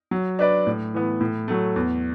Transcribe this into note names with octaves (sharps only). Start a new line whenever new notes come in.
F#3
D4 B4 D5
A2
E3 B3
A2
F#3 A3
E2